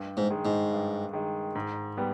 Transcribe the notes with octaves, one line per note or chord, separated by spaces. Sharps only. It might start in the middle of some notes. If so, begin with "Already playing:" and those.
Already playing: G2
G#2
D#3 G#3
G#2
G2
D#3 G#3
G#2
G3 B3